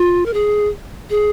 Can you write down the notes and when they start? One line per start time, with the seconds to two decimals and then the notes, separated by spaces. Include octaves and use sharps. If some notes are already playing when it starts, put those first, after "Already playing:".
Already playing: F4
0.26 A#4
0.34 G#4
1.10 G#4